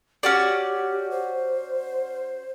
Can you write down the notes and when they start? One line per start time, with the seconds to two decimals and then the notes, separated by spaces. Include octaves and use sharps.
0.23 C#4 F#4 G4 D5
1.11 C5